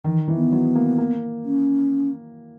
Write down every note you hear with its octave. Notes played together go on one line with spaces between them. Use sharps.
D#3 E3
E3
B3
F#3
A#3
A#3
C#4